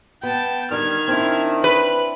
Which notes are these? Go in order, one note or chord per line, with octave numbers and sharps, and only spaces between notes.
B3 G5 A5
D3 D#3 G3 F6 G#6
C4 D4 E4
B4 B5